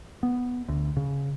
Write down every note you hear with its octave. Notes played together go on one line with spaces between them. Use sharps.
B3
D2
C#3